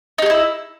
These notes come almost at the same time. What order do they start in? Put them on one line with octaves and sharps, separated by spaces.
D#4 G4 G#4 E4